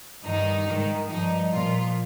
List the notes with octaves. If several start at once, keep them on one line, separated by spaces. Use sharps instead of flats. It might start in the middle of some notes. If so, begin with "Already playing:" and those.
G2 D#3 D#4
G#2 D#3
G2 F3 D#4
A#2 F3 F4